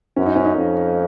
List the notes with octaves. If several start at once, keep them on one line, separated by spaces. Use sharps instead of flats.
F#2 C#4
D#4
C#4
D#4
F2